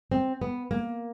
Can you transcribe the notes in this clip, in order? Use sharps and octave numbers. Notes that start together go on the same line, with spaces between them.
C4
B3
A#3